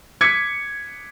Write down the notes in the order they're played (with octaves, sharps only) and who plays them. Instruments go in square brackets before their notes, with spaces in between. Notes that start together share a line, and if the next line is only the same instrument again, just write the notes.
[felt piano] D6 G#6 B6 C#7